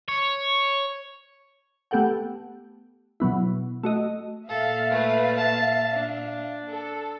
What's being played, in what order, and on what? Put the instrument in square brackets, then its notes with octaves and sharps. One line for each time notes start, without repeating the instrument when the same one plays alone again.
[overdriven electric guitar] C#5
[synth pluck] A3 B3 G4 A4 F#5 G5
B2 F#3 B3 E4
A3 F#4 D#5
[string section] A#2 E5 F5 [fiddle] A4
[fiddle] A3 B4
A5
D4
[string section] A4